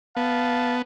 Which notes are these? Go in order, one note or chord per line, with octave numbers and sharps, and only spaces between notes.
B3 F5 A5